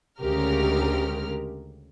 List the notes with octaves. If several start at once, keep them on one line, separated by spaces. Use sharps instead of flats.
D2 C#3 G#3 G4 A#4 F6